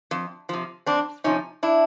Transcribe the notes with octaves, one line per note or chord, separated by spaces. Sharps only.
F2
C3 F3
F2 C4 D4
C3 F3 C#4 D#4
D4 E4